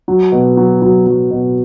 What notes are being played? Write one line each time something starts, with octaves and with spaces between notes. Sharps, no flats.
F#3
B2
F#3
F#3
F#3
B2